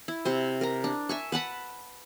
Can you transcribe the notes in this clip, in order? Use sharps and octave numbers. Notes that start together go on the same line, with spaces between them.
E4
C3 C5
A#4 A#5
D4
E5 G#5 C#6
B4 F#5 A5 B5